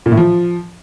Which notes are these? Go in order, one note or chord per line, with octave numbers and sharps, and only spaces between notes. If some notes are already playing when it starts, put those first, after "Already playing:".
A#2
A2
F3